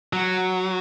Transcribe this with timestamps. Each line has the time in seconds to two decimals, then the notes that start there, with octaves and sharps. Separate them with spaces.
0.13 F#3